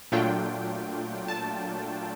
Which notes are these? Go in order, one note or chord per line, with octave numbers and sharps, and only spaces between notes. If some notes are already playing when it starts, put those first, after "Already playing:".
A#2 F#3 A3 D4 F4 G5
A5